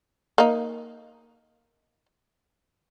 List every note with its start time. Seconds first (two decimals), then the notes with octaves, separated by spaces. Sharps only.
0.38 A#3 D#4